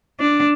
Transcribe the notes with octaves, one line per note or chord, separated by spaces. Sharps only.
D4